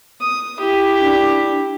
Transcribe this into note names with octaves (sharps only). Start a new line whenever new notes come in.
D#6
E4 G4
D4